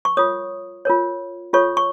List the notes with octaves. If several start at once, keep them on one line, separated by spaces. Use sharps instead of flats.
C#6
F4 A#4 C#5 D#6
F4 A#4 C#5
F4 A4 C#5 C#6
C#6